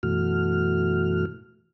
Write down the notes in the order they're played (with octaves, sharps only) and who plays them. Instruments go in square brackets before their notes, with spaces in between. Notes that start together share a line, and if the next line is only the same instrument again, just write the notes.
[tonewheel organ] F#2 B2 E3 A3 F#4 F6